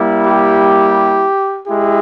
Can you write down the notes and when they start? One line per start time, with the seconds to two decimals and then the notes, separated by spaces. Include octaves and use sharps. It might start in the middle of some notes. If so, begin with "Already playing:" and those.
Already playing: G3 A#3 E4
0.26 G4
1.67 G#3 E4 G4